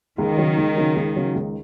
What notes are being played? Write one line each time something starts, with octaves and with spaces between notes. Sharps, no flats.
C#2 D#3
C#3 F#3
C#2
C#3 F#3
C#2
C#3 F#3
C#2